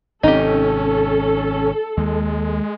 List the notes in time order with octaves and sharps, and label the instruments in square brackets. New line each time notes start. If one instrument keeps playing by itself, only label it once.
[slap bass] G#1 C3 C4 [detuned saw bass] C#4 [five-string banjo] D#4 G4 [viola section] A4
[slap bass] D#2 [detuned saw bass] G#3